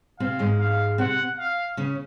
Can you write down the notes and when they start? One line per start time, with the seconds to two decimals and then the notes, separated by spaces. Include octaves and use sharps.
0.20 C3 C4 F5
0.39 G#2 G#3
0.60 F5
0.98 C3 C4 F#5
1.38 F5
1.77 C#3 C#4